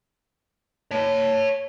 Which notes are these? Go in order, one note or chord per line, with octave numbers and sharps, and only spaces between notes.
C#5 A5